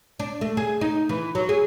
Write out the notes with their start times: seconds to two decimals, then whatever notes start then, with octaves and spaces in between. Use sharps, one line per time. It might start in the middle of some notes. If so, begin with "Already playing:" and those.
0.20 D4
0.41 A3
0.57 G#4
0.81 D#4
1.09 E3
1.35 F#3
1.49 G#4